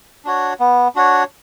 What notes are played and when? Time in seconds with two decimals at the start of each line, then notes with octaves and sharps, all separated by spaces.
0.25 D4 F#4 C#5
0.60 B3
0.95 D4 F#4 C#5